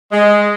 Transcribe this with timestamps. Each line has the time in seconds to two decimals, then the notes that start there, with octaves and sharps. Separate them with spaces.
0.12 G#3